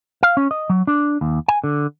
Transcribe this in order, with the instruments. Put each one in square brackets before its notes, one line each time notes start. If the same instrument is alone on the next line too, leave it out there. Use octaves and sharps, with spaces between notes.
[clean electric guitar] F5
C#4
D#5
F#3
D4
D#2
G#5
D3